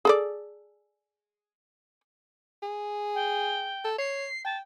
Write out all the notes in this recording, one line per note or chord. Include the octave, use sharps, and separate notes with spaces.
G#4 A4 D5
G#4
G5
A4
C#5 C7
G5 A5